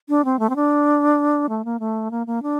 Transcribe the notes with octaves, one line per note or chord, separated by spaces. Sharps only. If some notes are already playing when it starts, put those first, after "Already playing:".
D4
C4
A3
C4
D4
A3
A#3
A3
A#3
A#3
D4